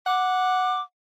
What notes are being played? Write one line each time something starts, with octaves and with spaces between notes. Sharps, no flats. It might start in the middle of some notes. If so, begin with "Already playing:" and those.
F#5 D6